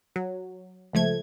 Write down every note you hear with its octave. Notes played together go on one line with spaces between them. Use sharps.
F#3
C#2 F3 A3 G#6